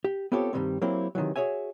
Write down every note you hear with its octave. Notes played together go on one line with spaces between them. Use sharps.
G4
B3 C4 F4 G4 A4 C#5
G2 D#3 E3 G3 G#3 C4
F#3 A#3 C4 E4 G4
C3 D#3 E3 F#3
F#4 G#4 C#5 E5 G#5